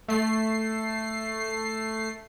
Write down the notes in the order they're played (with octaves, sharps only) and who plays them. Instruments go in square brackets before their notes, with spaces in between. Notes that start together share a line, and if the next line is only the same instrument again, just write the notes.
[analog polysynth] A3 C7